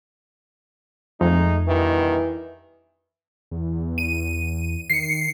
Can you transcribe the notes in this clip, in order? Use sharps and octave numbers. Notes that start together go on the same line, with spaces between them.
F2 G#3 A3 D#4
G2 B2 D#3 E3
E2
D#7
D#3 C7 C#7